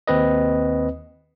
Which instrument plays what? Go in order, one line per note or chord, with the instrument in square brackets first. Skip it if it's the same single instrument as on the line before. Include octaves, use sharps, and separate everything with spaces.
[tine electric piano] D#2 C4 B4 D#5